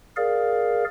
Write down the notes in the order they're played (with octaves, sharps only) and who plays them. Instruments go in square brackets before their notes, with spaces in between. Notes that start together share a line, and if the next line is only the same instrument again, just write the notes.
[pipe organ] G#4 A#4 D5 F5